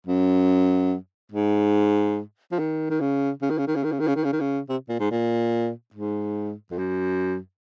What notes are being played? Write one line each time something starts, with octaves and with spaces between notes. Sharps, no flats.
F#2
G#2
F3
D#3
D#3
C#3
C#3
D#3
C#3
D#3
C#3
D#3
C#3
D#3
C#3
D#3
C#3
D#3
C#3
C3
A#2
G#2
A#2
G#2
F2
F#2